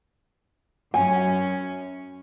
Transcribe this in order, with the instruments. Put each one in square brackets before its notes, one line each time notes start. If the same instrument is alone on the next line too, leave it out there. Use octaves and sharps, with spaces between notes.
[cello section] F#2 C#4 [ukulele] G#5